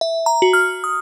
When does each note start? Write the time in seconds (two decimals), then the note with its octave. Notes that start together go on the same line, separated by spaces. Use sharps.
0.01 E5
0.26 A#5
0.42 F#4
0.53 F6
0.84 D#6